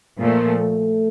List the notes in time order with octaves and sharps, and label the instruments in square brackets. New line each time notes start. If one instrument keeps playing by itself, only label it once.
[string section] A#2 F3 A3 [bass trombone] A#3
[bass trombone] A3